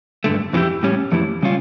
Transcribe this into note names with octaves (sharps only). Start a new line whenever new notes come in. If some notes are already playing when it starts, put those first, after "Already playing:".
G2 D3 A3
F2 E3 A3 E4 G4
A2 G3 C#4
F2 E3 A3 E4 G4
C#3 G3 C#4 F4